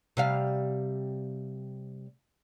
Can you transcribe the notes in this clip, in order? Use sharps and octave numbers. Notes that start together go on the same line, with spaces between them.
C3 G3 F5